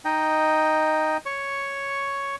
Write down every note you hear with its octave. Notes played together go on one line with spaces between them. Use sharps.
D#4 D#5 G5
C#5 C#6